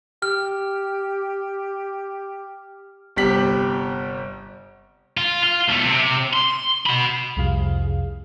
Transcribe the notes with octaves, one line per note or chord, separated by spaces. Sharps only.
G4 F6
G1 C3 G3 G4 B6 F#7
F4
F4
B1 A3
C3
C6
F#4 B5
C2 F2 C3 G#4 F5